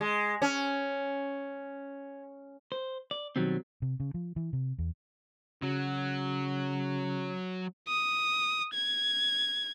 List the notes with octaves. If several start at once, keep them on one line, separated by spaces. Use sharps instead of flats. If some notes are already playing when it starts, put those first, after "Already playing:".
G#3
C#4
C5
D5
B2 D#3 F#3 G3 C4
C3
C#3
F3
E3
C3
E2
C#3 F#3
D#6
G#6